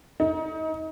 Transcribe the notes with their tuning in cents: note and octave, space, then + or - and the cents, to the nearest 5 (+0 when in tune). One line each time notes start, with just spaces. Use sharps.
D#4 +25